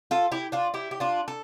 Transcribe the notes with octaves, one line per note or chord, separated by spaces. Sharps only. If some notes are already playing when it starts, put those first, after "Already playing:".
F4 A4
E4 G4
D4 F4
E4 G4
G4
D4 F4
A4